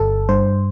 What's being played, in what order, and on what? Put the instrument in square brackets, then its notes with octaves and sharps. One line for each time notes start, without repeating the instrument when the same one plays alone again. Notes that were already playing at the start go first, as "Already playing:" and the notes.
Already playing: [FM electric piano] G1 A4
G2 C5